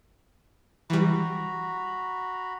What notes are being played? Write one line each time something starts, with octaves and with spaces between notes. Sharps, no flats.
E3 G3 F#4 A#5 B5